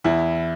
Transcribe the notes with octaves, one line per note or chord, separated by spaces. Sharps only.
E2 E4